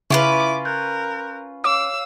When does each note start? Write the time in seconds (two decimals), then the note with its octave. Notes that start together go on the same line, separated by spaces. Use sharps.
0.10 C#3 C#4 E4 F4 B4 E5 D6
0.65 A#4 F#6 G6
1.64 C#5 F5 D6 E6